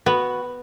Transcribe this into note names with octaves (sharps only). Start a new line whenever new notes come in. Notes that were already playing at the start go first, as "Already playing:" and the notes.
B3 F#4